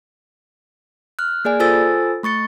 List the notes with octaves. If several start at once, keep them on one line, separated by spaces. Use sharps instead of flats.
F6 F#6
A#3 G#4 D5 G#5
F4 A4 C5 G#5 E6 A6
A3 C#6 A6 C#7